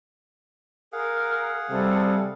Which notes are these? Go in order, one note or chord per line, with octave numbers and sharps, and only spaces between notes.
G#4 A#4 F5 F#5
C3 G3 A4